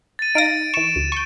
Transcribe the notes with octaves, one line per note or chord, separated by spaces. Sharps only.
A6 D#7
D#4 F5 A#6 D7
E3 C#6 E7
D2
C#6 G6